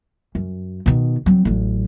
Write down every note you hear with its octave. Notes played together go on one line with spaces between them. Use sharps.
F#2
B2 D#3
F#3 C4
A1 F#3